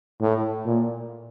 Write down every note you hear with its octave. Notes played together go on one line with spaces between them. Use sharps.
A2
A#2